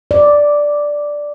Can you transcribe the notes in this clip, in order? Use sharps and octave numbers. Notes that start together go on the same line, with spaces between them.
D5